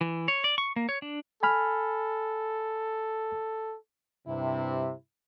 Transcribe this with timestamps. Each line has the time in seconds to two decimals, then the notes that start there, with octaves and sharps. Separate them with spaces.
0.01 E3
0.28 C#5
0.44 D5
0.58 C#6
0.76 A#3
0.89 C#5
1.02 D4
1.43 A4 G#5 B5 F6
4.27 G2 C3 E4